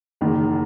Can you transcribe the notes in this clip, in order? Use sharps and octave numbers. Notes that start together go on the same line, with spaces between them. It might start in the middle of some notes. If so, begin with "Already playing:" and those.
F#1 E2 D#3